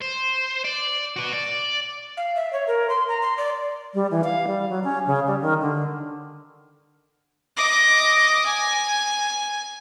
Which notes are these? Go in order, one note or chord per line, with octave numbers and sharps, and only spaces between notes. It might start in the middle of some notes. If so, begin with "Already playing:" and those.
C5
D5
F#4 B4
D5
F5
E5
C#5
A#4
C6
A#5
C6
D5
G3
E3
F5
G3
F#3
C#4
C#3
G3
D#3
D3
D#5 D6
G#5